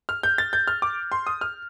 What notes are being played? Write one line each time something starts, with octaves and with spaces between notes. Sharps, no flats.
F6
G6
A6
G6
F6
D6
C6
D#6
F6